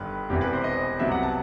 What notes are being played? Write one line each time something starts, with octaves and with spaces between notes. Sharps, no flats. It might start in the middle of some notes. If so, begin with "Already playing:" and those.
Already playing: G1 G2 D#3 B4
E1 E2 C3 E3 G4
B4
C5
D#5
C2 C3 F#3 B3 E5
F#5
A5